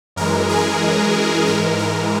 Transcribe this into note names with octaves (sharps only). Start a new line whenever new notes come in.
F#2 E3 G#3 A#4
G#4
G#2 E3 G#3 A#4
A#4